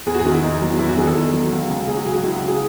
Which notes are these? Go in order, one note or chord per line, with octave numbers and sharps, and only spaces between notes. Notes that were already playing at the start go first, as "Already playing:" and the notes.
E2 G#4
F#4
G#4
D#3
E4
E2 D#4
F#3
E2 E4
F#4
D#3 G#4
A4
E2
F#3
C#2
C#3
C#2 G#4
F#4
F#3 G#4
F#4
C#2 E4
F#4
C#3
G#4